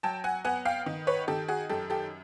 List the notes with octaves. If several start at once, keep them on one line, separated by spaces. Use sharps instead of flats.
F#3 G5 A5
F#5 G#5
B3 F#5 G#5
F5 G5
D#3
B4 C#5
D#3 G4 A4
F#4 G#4
F#2 G4 A4
G4 A4